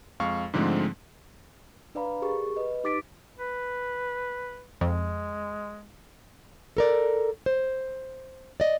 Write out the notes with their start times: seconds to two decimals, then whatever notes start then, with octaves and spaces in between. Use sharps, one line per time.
0.20 F2 G#3 F5 C#6
0.54 G#2 D3 F3 G#3 A3 C4
1.95 D4 B4 D5 F5 A#5 B5
2.22 G4 G#4 A#4 C#6
2.56 B4 D#5
2.84 D#4 G4 D6 A6 B6 D7
3.38 B4
4.81 F2 G#3
6.77 A4 A#4 D5
7.46 C5
8.60 D5 D#5